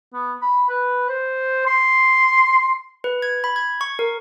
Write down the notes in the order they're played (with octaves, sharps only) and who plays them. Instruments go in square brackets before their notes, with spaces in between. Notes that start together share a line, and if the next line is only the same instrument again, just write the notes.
[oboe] B3
B5
B4
C5
C6
[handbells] B4
G#6
B5
G#6
C#6
A#4